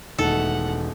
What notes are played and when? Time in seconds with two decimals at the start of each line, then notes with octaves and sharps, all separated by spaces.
0.18 E1 D#3 A3 A4 F#5